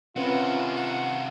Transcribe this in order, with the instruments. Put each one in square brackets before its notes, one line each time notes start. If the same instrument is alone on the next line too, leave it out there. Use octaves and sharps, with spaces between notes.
[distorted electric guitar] C3 D#3 [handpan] C4 C#4 B4 [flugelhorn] F4 [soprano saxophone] F#5
[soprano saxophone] F#5